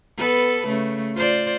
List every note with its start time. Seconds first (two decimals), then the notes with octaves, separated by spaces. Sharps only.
0.17 B3 A4 B4
0.66 C#3 A3
1.15 F4 C5 D5